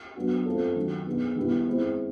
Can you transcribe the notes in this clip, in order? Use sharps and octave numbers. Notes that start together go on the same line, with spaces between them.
F#3 B3 D4 F#4
A3 C4 F4 A4
D#3 F#3 A3
B3 D#4 G#4
D#3 G3 B3 E4
G#3 C4 E4